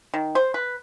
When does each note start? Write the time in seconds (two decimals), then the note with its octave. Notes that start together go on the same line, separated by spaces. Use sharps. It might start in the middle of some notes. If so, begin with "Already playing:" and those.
0.14 D#3
0.35 C5
0.54 B4